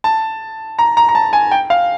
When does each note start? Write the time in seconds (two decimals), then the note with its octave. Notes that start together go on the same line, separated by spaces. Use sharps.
0.04 A5
0.79 A#5
0.97 A#5
1.09 A#5
1.15 A5
1.33 G#5
1.51 G5
1.70 F5